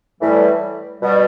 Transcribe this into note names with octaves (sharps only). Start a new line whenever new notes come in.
A2 E3 G3
B2 G3